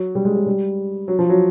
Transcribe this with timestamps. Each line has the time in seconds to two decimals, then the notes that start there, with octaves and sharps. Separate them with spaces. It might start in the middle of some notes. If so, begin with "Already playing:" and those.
Already playing: F#3
0.15 G3
0.25 G#3
0.36 G3
0.46 G3
1.08 F#3
1.19 F3
1.29 F#3